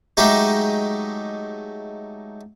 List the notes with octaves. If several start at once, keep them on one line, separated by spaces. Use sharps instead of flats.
F#3 G#3 A3 D#4 G4